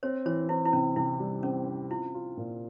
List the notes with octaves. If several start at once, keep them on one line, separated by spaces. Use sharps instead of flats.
C4 C#5
E3 C#5
C4 E4
E4
C3 C#4
C3 E4
G3
C4 C#4
C4
E4 F4
F4
A#2